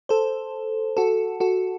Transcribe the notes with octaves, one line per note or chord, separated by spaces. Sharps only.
A4 C5
F#4 A4
F#4 A4